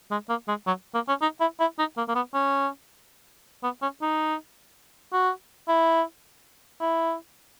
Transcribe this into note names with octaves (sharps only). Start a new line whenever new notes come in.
G#3
A#3
G#3
F#3
A#3
C#4
D#4
E4
E4
D#4
A#3
A#3
B3
C#4
B3
C#4
D#4
F#4
E4
E4